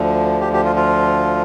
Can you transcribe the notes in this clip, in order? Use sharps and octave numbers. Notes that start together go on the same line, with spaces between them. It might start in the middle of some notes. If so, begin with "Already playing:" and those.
Already playing: D2 D3 F3
G4
G4
F4
F4